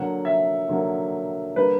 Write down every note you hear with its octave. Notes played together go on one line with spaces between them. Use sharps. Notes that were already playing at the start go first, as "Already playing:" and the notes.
Already playing: D3 F#3 A#3 F#5
E5
D3 F#3 A#3
D3 G3 A#3 B4